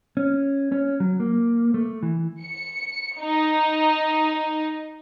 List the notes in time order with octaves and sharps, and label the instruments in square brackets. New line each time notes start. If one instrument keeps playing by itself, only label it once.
[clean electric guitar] C#4
C#4
F#3
A#3
A3
E3
[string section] C#7
D#4